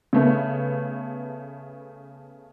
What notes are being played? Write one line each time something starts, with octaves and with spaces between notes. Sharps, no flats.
C#3 A3 B3